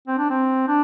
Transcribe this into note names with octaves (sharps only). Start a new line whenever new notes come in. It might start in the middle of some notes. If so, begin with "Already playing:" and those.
C4
D4
C4
D4